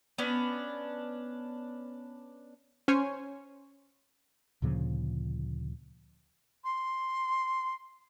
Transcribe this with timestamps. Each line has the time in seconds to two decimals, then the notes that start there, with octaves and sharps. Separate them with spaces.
0.18 B3 C#4 D4
2.88 C#4 C5 C#5 G#5
4.62 D2 A#2 C#3 F3
6.64 C6